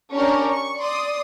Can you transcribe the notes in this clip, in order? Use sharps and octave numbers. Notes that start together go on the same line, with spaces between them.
C#4 D4 G4 A#4 C#5
C#6
D5 C6 D#6